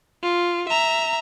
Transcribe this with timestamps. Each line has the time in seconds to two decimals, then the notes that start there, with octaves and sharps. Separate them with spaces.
0.23 F4
0.69 E5 A#5